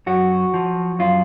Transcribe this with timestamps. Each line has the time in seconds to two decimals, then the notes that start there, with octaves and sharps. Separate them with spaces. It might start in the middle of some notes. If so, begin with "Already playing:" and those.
0.06 F#2 F#4
0.54 F3
0.99 F#2 F4